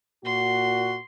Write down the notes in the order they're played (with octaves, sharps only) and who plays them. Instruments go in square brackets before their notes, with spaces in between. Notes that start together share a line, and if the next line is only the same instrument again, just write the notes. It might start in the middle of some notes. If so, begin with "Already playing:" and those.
[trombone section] A#2 F#4 [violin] C6